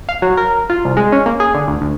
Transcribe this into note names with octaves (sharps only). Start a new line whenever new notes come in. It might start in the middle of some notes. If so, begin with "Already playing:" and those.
F5
F#3
A#4
F4
C2
G#3
C#4
A#3
G#4
D3
D2
D2